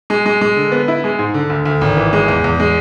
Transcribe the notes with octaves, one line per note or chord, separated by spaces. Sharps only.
G#3
G#3
G#3
D3
B3
E4
G#3
G#2
D3
D2
D2
G#1
E3
G#3
E2
E2
G#3